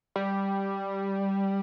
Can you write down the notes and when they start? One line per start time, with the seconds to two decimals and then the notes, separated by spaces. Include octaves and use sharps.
0.16 G3